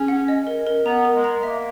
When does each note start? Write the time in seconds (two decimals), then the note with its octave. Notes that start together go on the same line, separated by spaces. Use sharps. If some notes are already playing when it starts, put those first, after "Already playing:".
Already playing: C#4 G#4
0.08 F#5
0.28 D#5
0.47 A#4
0.67 A#4
0.85 B3 A#5
1.05 A#4
1.14 G#3
1.24 A#5
1.43 A#3 E5